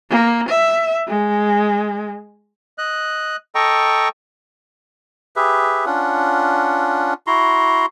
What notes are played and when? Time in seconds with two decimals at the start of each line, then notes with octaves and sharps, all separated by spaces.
0.11 A#3
0.49 E5
1.08 G#3
2.78 D#5 F#6
3.55 A4 D#5 G5 A#5 C#6
5.36 G4 G#4 B4 E5
5.86 C#4 D4 F4 F#5
7.27 E4 F#4 A#5 C6